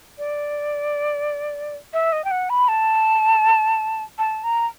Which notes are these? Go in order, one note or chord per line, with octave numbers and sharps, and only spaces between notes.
D5
E5
D#5
G5
F#5
B5
A5
A5
A#5